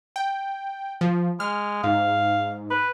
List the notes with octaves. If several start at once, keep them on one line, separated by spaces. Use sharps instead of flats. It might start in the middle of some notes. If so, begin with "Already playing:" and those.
G5
F3
G#3 F6
G#2 F5
B4